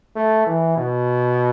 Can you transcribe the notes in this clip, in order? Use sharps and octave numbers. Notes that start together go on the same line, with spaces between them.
A3
E3
B2